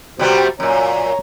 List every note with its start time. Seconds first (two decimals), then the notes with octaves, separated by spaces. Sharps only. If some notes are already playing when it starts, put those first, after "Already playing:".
0.19 C3 G3 B3 F#4 G4 C5
0.60 F#2 A#2 C#5 A#5